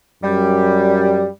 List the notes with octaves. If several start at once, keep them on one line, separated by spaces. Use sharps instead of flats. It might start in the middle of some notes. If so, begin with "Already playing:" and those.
F#2 G3